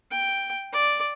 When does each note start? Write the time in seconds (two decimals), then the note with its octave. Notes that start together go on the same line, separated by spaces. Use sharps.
0.11 G5
0.72 D5